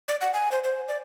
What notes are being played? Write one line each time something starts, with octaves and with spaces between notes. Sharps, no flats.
D5
F#5
G#5
C5
C5
D5